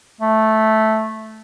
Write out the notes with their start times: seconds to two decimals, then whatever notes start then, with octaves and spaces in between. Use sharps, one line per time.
0.21 A3